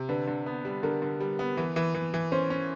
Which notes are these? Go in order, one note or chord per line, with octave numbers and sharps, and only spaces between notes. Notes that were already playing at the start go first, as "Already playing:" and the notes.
Already playing: C3
D3 B4
D3
B3
G3
D3 A#4
D3
G3
B3
E3
E3
E3
E3
C#4 C5
C#4